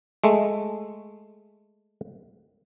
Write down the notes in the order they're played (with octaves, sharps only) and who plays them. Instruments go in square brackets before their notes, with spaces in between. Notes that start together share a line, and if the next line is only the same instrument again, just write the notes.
[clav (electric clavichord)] G#3 A3